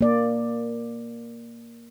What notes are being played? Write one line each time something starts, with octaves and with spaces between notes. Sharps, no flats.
A#3 D5